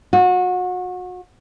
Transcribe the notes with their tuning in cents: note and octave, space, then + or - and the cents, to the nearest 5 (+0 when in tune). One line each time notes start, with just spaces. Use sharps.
F#4 -30